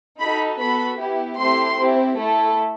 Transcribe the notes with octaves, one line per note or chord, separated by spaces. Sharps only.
D#4 F#4 A4 B5
B3 F#4 A4 B5
B3 E4 G4
A3 C4 E4 G4 C6
C4 E4 G4
A3 E4 A4